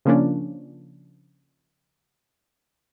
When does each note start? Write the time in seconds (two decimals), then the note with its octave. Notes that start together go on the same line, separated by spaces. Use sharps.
0.05 C#3 F3 A#3 C#4 D4